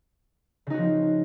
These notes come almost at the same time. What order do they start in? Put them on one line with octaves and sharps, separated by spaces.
C#3 D#4 F#4 F3 C4